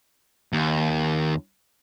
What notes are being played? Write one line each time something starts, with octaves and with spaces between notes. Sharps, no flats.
D#2